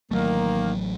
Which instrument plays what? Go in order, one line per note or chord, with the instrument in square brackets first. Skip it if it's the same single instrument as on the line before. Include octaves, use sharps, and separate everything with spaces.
[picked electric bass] A1 F#3 A3 [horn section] D#3 A#3